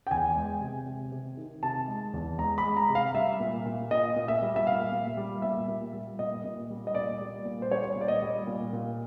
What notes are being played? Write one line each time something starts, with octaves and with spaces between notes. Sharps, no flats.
G5
E2 G#5
G#3
C3
C3
C3
D#3
C3 A5
G#3
E2
G#3 A#5
B5
G#3
A#5
C3
F5
G3 E5
A#2
A#2
A#2 D#5
A#2
E5
G3
E5
A#2 F5
A#2
G3
A#2 E5
A#2
G3
A#2 D#5
A#2
G3
D#5
A#2 D5
G3
A#2
C5
G3 C#5
A#2
D5
D#5
G3
A#2
A#2